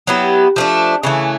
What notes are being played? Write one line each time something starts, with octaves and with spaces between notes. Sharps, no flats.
F#3 B3 E4 G4
F3 A3 D4
C#3 E3 A3